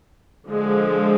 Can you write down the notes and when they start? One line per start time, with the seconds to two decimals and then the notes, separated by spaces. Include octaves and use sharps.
0.48 D3 F3 G#3